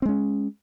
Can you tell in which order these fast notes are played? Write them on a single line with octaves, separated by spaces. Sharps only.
C4 G#3 C#4